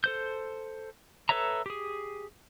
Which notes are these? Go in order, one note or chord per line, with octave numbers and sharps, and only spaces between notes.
A4 C5 G6
A4 B4 C#5 E5 A#5
G4 G#4